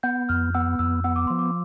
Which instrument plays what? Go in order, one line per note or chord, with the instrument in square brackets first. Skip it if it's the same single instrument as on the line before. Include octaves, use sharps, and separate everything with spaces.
[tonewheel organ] B3 [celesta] G6
[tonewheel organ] F2 [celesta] F6
[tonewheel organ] B3 [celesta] E6
[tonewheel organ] F2 [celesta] E6
[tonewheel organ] B3 [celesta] E6
[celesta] D6
[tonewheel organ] F3 [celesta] C6
[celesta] D6